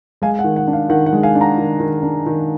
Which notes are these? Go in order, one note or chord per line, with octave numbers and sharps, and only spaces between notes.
G#3 F5 G#5
F#5
D#3
F#5
D4
F5
D#3 F#5
F#5
G#3
F5 G#5
D4
F#5 A#5
D#3
D#3
D4
D#3